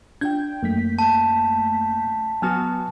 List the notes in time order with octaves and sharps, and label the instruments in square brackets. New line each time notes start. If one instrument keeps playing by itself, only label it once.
[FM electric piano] D4 F4 G5 [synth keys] G6 [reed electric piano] G#6
[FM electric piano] F#2 A3 B6 [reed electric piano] A#3
[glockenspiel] A5
[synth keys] F#3 B3 F#4 [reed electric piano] G#5 F6